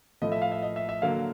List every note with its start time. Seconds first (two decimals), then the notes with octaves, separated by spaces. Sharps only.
0.22 A2 F3 A3 D#5
0.32 E5
0.42 F5
0.52 E5
0.62 D#5
0.76 E5
0.89 E5
1.02 D3 F#3 A#3 F5